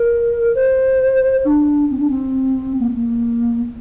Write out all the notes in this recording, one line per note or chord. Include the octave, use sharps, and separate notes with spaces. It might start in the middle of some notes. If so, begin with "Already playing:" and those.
Already playing: A#4
C5
D4
C4
D4
C4
A#3
A#3